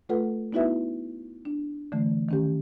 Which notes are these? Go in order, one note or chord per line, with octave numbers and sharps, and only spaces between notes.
A3 F4 A4 B4 F#5
B3 D#4 E4 F#4 B4 E5
D4
D3 E3 A3
D#3 C#4 G4